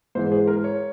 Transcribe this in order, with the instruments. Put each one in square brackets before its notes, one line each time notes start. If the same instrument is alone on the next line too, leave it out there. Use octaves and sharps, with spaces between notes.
[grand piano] G#2 E3 G#3 C5
G#4
A#4
C#5